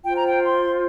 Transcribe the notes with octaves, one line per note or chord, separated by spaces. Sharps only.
F4 C5 G5
A#5
G5
C6